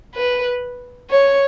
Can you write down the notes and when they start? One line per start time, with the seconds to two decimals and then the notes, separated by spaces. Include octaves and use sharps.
0.15 B4
1.10 C#5